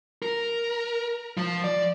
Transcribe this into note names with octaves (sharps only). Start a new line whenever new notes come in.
A#4
F3
D5